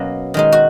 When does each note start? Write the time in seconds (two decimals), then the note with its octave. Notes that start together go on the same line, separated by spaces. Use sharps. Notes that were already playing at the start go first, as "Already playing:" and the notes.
Already playing: B2 F#3 A#3 C#4
0.34 D#3 G#3 D#4
0.52 F#4